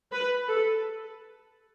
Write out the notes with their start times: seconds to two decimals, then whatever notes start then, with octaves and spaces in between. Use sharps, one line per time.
0.12 B4
0.48 A4